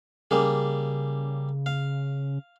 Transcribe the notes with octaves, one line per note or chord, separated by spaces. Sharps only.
C#3 G3 A#3 G#4
F5